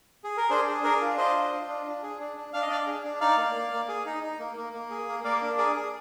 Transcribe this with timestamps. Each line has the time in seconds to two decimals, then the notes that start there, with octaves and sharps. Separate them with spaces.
0.24 G#4
0.37 A#4
0.49 D4 G#4 C5
0.67 G#4
0.84 D4 A#4
1.01 F4
1.18 D4 C5 D#5
1.35 F4
1.52 F4
1.69 D4
1.86 D4
2.03 G#4
2.20 D4
2.37 D4
2.53 D4 F5
2.62 D#5
2.70 D4 D5 F5
2.87 G#4
3.04 D4
3.20 D#4 D5 F5
3.37 A#3
3.55 A#3
3.72 A#3
3.88 G#4
4.06 D#4
4.23 D#4
4.39 A#3
4.57 A#3
4.73 A#3
4.90 G#4
5.08 A#3
5.24 A#3 D5 F5
5.42 D4
5.58 G#4 A#4 D5
5.76 G#4